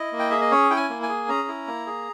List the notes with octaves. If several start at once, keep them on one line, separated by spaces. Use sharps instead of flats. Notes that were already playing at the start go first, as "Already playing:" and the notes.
Already playing: E4 D#5
A#3
G5
G#4 E5
D#5
C#4 C#5
E4 G5
G#5
A#3
G#5
G#4
C#4 A#5
E4
A#3
G#4